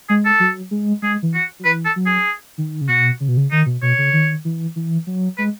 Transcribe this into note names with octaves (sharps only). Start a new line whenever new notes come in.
G#3 G#4
A4
F#3
G#3
G#3 G#4
E3
F#4
F#3
E3 B4
A4
F#3
G#4
D#3
C#3
B2 F#4
C#3
B2
C#3
D#3 D#4
B2
B2 C#5
C#3
D#3
E3
E3
F#3
G#3 B4